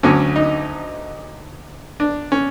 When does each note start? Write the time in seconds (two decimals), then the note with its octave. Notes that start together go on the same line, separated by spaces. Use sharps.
0.03 D2 D3 F#3 A3 C#4
0.36 D#4
2.00 D4
2.32 C#4